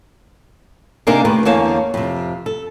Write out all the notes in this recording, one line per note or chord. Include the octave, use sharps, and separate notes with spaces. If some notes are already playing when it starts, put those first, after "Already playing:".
C3 A#3 D4 D#4 G#4 A#4
D#3 A3 D4 G4 B4
E2 D3 A#3 C#5 F5 A5
F2 C3
A4